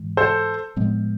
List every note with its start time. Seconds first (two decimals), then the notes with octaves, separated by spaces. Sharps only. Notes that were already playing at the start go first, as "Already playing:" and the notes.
Already playing: G#2 E3 G#3
0.17 A4 C5
0.76 A2 F3 G#3 B3